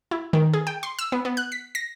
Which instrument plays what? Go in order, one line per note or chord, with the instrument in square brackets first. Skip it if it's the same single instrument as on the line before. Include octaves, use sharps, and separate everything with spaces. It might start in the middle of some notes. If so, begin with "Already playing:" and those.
[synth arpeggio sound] E4
D#3
G#4
G5
C6
E6
B3
B3
F#6
B6
A#6